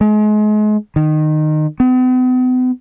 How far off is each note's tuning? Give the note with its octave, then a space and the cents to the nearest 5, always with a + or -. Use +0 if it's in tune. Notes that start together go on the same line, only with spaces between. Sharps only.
G#3 +35
D#3 -20
B3 +45